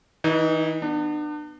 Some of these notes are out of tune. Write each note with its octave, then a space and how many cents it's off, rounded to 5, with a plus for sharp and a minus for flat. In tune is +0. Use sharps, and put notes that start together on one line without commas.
E3 -35 D#4 +0
B3 +0 D4 +35